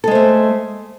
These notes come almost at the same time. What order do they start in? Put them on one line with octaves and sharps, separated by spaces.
A4 G#3 C5 A3